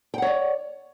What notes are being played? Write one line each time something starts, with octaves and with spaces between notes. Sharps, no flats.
C#5 D5 F#5 G5